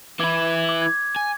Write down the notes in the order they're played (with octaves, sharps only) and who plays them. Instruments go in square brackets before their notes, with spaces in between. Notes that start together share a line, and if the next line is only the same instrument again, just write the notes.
[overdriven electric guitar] E3 E4 [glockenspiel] D6 G#6
[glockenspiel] D6
G#6
[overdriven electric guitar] G#5